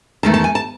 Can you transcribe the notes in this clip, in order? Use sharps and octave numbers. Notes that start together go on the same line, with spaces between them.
E2 D#3 A3 A5
A5
G#5
A5